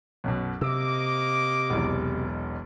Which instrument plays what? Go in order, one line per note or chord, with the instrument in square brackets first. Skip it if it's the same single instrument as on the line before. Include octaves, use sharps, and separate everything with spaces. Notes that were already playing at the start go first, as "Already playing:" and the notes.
[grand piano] B1 F#2 B2
[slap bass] C3 [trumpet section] A#3 D#5 D6 [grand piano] E6
[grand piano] E1 B1 E2